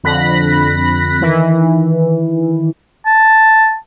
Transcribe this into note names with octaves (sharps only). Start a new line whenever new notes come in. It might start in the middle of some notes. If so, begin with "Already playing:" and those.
F2 D3 B5 F#6 A#6 B6
D#3 E3
A5